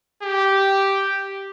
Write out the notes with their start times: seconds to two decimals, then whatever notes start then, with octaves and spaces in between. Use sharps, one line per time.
0.23 G4